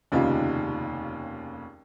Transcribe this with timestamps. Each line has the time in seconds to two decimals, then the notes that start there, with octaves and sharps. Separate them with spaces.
0.12 F1 D#2 C#3 D#4 F4 G4